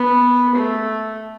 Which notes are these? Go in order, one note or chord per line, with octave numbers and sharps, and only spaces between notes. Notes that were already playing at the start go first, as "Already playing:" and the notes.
Already playing: B3
A3